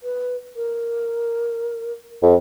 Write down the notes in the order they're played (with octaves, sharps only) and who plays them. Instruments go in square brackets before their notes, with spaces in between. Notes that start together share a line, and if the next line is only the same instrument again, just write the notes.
[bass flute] B4
A#4
[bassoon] F2